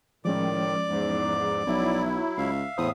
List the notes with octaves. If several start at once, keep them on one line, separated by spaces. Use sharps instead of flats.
A2 D#3 F3 G#3 C#4 D5 D6
E2 G#2
B1 F#3 E4
C#2 E5 F5
E2 A2 C5 D#6